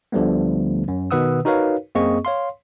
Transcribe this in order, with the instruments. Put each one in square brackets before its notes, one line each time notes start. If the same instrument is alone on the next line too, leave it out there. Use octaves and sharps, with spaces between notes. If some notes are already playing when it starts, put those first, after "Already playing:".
[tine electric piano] D2 D3 F3 G3 A3 B3
F#2
B2 D#3 B4 F#5 D#6 E6
D#4 F#4 A#4 B4 C#5 F5
F#2 A#3 C4 G#4 D#5 C#6
C#5 F5 C6